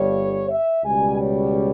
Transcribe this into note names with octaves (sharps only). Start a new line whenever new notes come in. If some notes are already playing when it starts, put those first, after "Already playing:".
Already playing: G1 G2 G3 C#5
E5
C#2 B2 G3 G#5
C#5